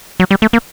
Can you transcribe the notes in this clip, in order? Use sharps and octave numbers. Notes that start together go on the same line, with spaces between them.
F#3
G3
A3
A#3